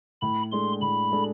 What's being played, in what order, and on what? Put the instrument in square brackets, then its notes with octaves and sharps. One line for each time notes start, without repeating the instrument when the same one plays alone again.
[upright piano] A2 [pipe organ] B5
[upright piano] G#3 D4 A4 [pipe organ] C6
[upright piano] A2 [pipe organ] B5
[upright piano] G#3 D4 A4